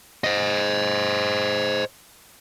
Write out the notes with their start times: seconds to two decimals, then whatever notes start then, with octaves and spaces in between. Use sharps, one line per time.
0.24 C5 D#5